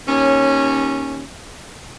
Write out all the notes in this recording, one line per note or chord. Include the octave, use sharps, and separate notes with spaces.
D#2 C#4